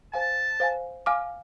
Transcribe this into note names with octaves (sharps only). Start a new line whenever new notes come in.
C5 F5 G#5 A5
C5 F5 G#5
F5 G#5 D6 F6